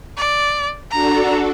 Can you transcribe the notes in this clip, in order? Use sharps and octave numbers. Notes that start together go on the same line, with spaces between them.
D5
D4 F#4 A4 A#5